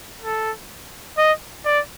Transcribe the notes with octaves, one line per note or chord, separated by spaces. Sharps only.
A4
D#5
D5